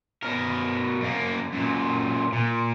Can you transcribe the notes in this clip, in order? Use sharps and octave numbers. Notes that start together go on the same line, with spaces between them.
B2 A#4
F#2 A#3
F#2 A#2
A#2